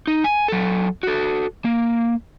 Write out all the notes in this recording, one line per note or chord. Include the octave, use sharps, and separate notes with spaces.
D#4
G#5
F#3 A4
F#4 A4
A#3